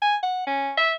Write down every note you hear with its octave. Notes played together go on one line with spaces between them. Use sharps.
G#5
F#5
C#4
E5